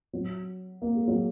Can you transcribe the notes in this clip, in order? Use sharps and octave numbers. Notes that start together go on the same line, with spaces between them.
F#3
A#3
G#3
F#3